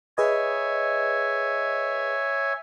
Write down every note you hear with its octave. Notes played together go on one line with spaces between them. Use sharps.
G#4 B4 C#5 D#5 E5 G#5